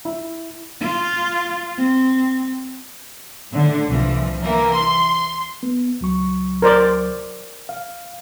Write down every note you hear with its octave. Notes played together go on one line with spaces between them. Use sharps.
E4
F4
C4
A2 D3
C2 E3 F3
E3 A#3
C6
B3
C#2 F#3 C#6
A#4 C5 D5
F5